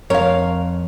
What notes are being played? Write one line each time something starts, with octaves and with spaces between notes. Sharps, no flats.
F2 A#4 C#5 F5